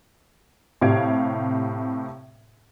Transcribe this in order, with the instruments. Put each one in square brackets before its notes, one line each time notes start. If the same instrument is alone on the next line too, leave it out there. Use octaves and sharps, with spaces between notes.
[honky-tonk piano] A2 C3 G4 F5 G#6 D7